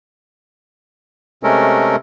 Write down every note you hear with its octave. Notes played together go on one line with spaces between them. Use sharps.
C3 G#3 A3 C#4 A4 A#4